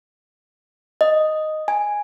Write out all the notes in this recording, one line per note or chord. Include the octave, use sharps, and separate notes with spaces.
D#5
G#5